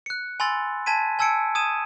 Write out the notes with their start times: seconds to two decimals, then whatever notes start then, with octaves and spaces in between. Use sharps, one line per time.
0.06 F#6 C#7
0.40 G#5 B5 C6 E6 A6
0.86 G#5 A5 G#6 B6 D#7
1.19 G#5 A5 E6 G#6 C#7 D7
1.55 D#6 G#6 D#7 E7